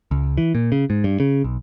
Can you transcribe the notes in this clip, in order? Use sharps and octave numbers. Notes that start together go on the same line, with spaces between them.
C#2
E3
A#2
C#3
G#2
G2
C#3
B1